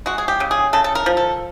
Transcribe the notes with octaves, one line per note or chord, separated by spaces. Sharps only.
G#3 F#4
G#4
G4
C#3
G#4
C#3 A4
A4
A#4
F3
A4